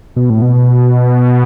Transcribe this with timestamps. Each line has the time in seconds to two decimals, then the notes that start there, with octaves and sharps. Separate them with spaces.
0.16 B2
0.30 A2
0.42 B2